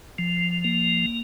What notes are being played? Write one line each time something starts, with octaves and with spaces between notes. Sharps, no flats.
F3
A#3